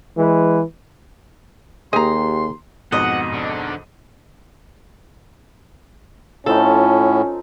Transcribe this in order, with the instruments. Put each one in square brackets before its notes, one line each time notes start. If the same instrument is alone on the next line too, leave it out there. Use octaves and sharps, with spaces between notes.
[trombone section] E3 G#3 B4
[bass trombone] D#2 [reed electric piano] A#3 G4 G#4 [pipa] D#5 A#5 [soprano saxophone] C6
[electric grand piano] F2 G#2 B2 [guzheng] D#5 [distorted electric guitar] F#5
[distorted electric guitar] D3
[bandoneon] A2 [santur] F3 C4 D#4 [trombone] C#4 [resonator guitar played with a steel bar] A4